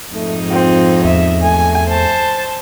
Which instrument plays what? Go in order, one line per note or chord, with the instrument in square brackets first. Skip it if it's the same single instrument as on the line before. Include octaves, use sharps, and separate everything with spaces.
[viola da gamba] F2 G#2 D#4 [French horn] A3
[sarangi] C4 [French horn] F4
[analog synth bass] E2 [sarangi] E5
[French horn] A3 [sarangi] G#5
[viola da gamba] C5 [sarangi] A5